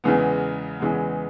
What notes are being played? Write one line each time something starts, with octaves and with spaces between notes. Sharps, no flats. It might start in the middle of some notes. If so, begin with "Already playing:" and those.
E2 C#3 E3 G#3 B3
E2 C#3 E3 G#3 B3